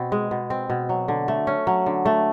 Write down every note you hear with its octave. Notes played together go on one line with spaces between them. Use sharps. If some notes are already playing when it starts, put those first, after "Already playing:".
Already playing: B2 C4
G#3
B2
C4
B2
F#3
D3
A3
C#4
F#3
D3
A3